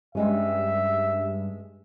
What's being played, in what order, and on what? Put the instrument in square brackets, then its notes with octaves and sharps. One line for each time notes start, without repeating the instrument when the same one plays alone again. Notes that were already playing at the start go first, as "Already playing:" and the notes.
[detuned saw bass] G2 [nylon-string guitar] G3 G#3 C#4 [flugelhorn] E5